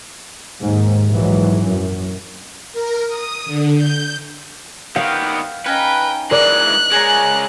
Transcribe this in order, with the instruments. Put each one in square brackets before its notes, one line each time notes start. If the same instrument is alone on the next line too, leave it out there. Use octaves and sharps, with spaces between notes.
[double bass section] D#2 G#2
A#1 G#2 E3 F#3
F#2
[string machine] A#4
D#6
D3
G6
[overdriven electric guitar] D#3 B3 [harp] F5 [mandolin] G5
[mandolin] C#4 D#4 [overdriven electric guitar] B4 [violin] G5
[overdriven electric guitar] E3 G#3 [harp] A#4 D5 [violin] F#6
[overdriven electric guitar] C#3 G#3 [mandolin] G#4 C#5 A#5